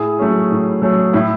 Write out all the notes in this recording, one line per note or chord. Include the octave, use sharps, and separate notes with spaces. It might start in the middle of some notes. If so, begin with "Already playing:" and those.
Already playing: A2 E4 G#4
F#3 A3 C#4
A2
F#3 A3 C#4
A2 E4